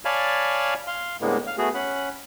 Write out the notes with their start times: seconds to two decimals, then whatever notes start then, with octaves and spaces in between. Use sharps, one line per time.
0.05 C#5 D5 F5 G#5 A5 B5
0.87 F5 C6
1.21 A2 D3 G#3 A#3 B3
1.47 F5
1.58 A3 B3 F#4 G#4
1.74 C#4 F#5 B5